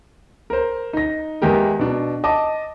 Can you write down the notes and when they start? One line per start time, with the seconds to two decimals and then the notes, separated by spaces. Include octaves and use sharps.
0.50 A#4 C5
0.93 D#4 A#6
1.42 E2 G#3 G4 A#4
1.79 B2 D4
2.24 D#5 A5 D6